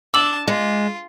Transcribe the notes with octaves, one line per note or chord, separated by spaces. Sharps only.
D4 A5 D6 E6 F#7
G#3 F4